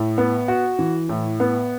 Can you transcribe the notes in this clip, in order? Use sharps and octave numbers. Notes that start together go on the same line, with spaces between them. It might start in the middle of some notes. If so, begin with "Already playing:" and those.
Already playing: A2
B3
F#4
E3
A2
B3